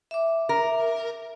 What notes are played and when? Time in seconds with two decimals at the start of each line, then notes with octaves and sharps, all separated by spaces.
0.11 E5 D6
0.49 A#4